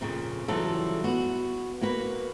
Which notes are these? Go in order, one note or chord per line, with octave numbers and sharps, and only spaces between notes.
F2 A#2 C#3
C#3 E3 F#3 G3 F4 A4
B3 F#4
A#3 F#4 B4